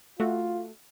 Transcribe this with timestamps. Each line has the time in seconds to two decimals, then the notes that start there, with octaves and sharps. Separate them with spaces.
0.20 A3 F4 F#4